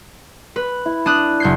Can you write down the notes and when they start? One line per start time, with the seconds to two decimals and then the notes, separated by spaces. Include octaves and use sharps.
0.56 B4
0.86 E4
1.06 D4 D#6 F#6
1.40 F#1 G6 C7